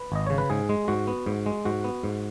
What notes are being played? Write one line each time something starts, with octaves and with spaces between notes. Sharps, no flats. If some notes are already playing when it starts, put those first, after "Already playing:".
Already playing: B4
G#1 D#5
C#3 C#5
B4
G#2 G#4
G#3
G#2 F#4
B3
G#2
G#3
G#2 F#4
B3
G#2